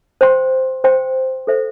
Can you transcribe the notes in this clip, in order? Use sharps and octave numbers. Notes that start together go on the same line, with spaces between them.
C5 G5 C6
C5 G5 C6
A4 C5 E5